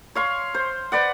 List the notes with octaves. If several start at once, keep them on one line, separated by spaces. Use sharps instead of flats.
C#5 F5 C6
C5
B4 D5 F#5